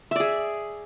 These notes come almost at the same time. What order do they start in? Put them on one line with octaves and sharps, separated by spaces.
E5 D5 G#4